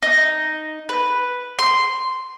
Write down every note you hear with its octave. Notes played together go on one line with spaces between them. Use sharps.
D#4
B4
C6